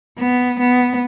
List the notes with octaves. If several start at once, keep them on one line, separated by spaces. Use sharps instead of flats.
B3
B3